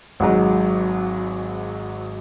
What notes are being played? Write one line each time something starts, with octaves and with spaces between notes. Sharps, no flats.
G#1 G#2 F#3